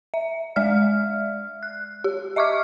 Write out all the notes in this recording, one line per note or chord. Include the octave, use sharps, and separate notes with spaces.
E5
G#3 D5 E5 F6
F#6
G4
D#5 E5 C#6 D6 F6